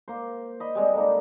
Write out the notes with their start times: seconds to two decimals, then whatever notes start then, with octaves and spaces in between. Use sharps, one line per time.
0.08 A#3 C5
0.60 D#5 B5
0.75 G3 G#3 C4
0.94 D3 A#3 D#4